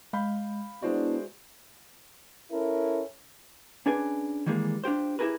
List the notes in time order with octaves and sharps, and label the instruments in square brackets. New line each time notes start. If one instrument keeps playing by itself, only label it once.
[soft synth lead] G#3 [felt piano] F5 B5 G6
[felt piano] G#3 C5 D5 [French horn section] B3 D4 E4 [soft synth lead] F#4
[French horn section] C#4 E4 A4 A#4
[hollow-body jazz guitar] C#4 D4 G#4 B4 D5 G#5
D#3 E3 G3 G#3 A#3
D4 F4 G4 C5
E4 G4 G#4 A#4 B4